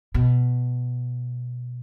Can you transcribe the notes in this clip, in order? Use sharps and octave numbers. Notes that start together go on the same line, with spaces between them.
B2